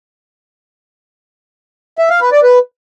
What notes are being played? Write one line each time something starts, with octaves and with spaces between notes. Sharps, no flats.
E5
F5
B4
D5
B4